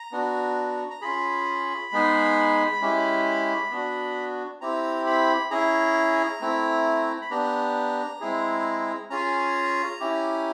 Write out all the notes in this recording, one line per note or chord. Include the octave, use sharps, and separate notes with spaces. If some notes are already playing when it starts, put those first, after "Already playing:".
Already playing: A#5
B3 D4 F#4
A#5
C#4 F4 G#4 B5
G#3 B3 D#4 G#4
G#3 C#4 E4 G4
B3 D4 F#4
C4 E4 G4 A#5
B5
C#4 E4 G#4 A#5
A3 C4 E4
B5
B3 D4 G4 A#5
G#3 C4 E4 G#4
C#4 F4 G#4 A#5
C#4 E4 G4